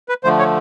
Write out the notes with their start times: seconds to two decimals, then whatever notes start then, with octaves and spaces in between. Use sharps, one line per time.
0.09 B4
0.24 D3 F3 A3 C5
0.39 C#5